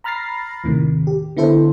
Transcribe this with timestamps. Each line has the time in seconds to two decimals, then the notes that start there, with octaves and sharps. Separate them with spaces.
0.04 A#5 B5 F6 A6 A#6 C7
0.64 D#2 A2 C3 D#3
1.07 G4
1.37 D3 B3 E4 A4 C5